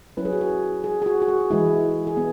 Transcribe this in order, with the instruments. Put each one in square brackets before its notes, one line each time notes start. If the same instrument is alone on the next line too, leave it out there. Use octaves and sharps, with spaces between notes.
[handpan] F#3 C#4 E4 B4
G#4
F#4
G#4
G#4
G#4
F#4
F#4
G#4
E3 G#3 E4 G#4
G#4
B3